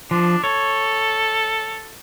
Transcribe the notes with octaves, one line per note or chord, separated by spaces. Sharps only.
F3 D4
A4 C#5